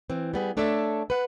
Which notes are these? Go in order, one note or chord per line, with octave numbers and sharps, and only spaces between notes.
E3 C4
G3 B3 G#4
A3 D4 A4 C#5 D5 E5
B4 F#5